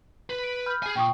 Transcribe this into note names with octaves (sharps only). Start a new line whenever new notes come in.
B4
D7
B5 F6 G6
G#4 G#5
A#2 G5 C#6 D#6